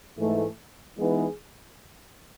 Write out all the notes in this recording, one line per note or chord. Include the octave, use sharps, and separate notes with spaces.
G#2 E3 A3
E3 G#3 B3 D#4 G#4